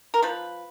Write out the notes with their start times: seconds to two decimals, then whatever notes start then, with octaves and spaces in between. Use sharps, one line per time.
0.14 A#4
0.23 F3 B4